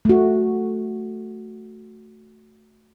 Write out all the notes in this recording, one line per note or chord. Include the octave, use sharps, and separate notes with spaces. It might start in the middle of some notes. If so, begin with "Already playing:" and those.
A3 F#4